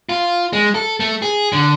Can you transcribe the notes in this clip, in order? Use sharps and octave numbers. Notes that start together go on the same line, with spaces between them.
F4
G#3
A4
A3
G#4
D3